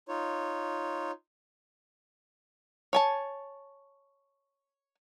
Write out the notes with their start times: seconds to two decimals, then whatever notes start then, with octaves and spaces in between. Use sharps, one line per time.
0.08 D#4 F4 C#5
2.93 C#5 G#5 A5